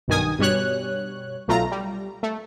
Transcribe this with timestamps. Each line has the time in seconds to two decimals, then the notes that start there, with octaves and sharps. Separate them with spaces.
0.08 B1 G2 D#3 G#5 D#6
0.39 G2 B2 G3 C#5 F#6
1.48 B1 A3 F4 A#5
1.71 G3
2.23 A3